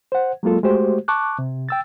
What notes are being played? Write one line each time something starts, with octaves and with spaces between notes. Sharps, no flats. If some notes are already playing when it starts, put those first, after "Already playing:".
C5 F#5
F#3 G#3 A#3 F4 A4
G#3 A3 F#4 G4 C5
A5 C#6 D6 F#6
C3
G5 E6 A6